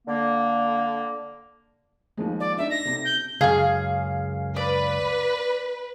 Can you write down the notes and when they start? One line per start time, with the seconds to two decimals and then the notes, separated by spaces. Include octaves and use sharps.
0.06 D3 A#3
2.17 D#2 F3 G#3
2.40 D5
2.57 D4 D#4 D5 E5
2.70 A#6
2.85 B1 C3
3.04 G6
3.41 C#2 F#2 G#4 F5
4.56 B4 D5